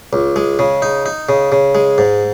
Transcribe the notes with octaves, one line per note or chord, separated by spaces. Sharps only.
C#2
G#3
C#3
D#4
D#4
C#3
C#3
G#3
G#2